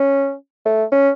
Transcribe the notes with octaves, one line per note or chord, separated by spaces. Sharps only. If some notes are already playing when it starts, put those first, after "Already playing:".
Already playing: C#4
A3
C#4